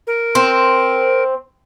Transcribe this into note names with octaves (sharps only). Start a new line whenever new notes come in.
A#4
C4